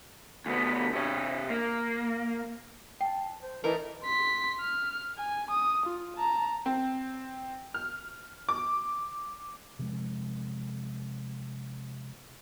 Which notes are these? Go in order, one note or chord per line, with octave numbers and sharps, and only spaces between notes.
D2 B3
C3 C#5
A#3
G5 A5
C5
E3 A3 D#4 A#4 D#5
C6 B6
F6
G#5
D#6
F4
A5 A#5
C4
F6
D6
C3 F3 G#3